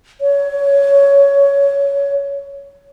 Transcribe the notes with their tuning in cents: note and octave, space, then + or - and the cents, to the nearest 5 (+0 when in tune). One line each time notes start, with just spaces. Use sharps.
C#5 +15